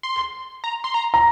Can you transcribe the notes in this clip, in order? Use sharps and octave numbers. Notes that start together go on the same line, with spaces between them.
C6
A#5
C6
A#5
A#5